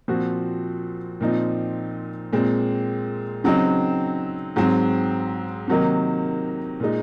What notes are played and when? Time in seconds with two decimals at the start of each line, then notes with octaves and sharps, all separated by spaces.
0.08 A#2 F3 C4 F#4
1.21 A#2 F3 C4 D#4
2.33 A#2 G#3 C4
3.44 C#3 F#3 C4 D#4
4.56 G#2 F#3 C4
5.68 C3 D#3 F#3 A#3 D#4
6.80 A#2 G#3 D#4